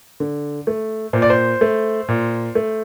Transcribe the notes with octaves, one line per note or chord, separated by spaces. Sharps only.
D3
A3
A#2 C5
D5
C5
A3
A#2
A3